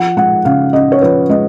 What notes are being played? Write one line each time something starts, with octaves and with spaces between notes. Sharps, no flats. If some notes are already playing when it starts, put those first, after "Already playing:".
Already playing: F3 F#5
G#3 F#5
C#3 F5
C#4 D#5
C#5
F3 B4
G#3 D#5